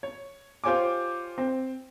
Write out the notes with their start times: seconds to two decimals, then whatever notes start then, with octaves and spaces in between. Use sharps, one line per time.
0.03 C#5
0.64 F4 G4 C5 C#5 G#5 D6
1.38 C4